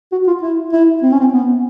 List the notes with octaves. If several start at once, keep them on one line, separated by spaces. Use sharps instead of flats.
F#4
F4
E4
E4
C4
C#4
C4
B3